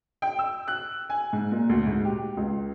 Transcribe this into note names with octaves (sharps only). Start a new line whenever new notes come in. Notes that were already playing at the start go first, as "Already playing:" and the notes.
G5
E6
F#6
G#5
G#2
A#2
D2
G#2
G4
C#2